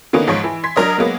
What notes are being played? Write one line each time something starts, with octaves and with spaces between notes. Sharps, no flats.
D3 D#3 A#3 B3 C#4 D#4
G#2 F3 C#5 C#6 D7
E3
C6 G#6 B6
F#3 D4 A#4 C#5 D#5
F#3 G#3 A#3 B3